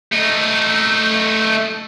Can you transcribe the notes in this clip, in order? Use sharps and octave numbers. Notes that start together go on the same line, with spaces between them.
A3 D#4